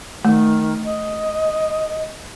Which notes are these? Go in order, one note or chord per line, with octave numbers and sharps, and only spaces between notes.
D#3 A3
D#5